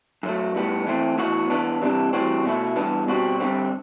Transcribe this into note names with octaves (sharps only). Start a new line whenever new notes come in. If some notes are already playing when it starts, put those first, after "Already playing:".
F#2 F#3 A3
A2 G3 B3
E3 A3 C4
A2 E3 B3 F#4
E3 B3 D4
C3 E3 G3 D4
A2 E3 G3 C4 F#4
B2 A3 E4
G2 E3 B3 D4
B2 G3 C4 F#4
G2 D3 G3 C4